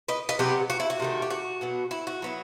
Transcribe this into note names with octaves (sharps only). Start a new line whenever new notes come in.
B4 D#5
B4 D#5
C3 F#3 B3 G4 B4
F#4
E4
F#4
C3 D#3 A3
G4
F#4
B2 F#3 B3
E4
F#4
F#3 B3 E4